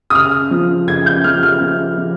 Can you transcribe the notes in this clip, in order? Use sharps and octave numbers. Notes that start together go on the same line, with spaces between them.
D#6
C#3 F6
F3
C#3 G#6
G6
F3 F6
F6
F3
F3